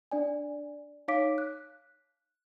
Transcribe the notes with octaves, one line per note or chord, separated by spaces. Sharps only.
D4 D5 G#5
D#4 C#5 F5 D6 B6 D7
F#6